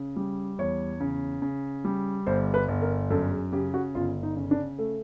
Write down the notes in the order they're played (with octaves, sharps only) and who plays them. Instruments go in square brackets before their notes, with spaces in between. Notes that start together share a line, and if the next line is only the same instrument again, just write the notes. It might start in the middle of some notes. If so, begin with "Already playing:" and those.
Already playing: [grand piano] C#3
G3
[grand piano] E2 [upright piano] C#5
[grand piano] C#3
C#3
G3
[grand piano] G1 [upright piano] C5
[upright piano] B4
[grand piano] G1
[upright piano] A#4
[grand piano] F#2 [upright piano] A4
[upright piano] G#4
[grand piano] C#3 [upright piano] G4
[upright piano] F#4
[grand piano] G1 [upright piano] F4
[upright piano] D#4
[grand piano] C#3
[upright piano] D4
A3